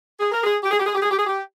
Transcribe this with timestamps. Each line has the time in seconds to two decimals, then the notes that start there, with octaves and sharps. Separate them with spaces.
0.20 G#4
0.32 A#4
0.44 G#4
0.63 G4
0.71 G#4
0.80 G4
0.86 G#4
0.95 G4
1.02 G#4
1.11 G4
1.19 G#4
1.27 G4